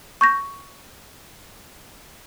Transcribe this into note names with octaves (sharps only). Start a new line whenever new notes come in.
C#6 G6 A#6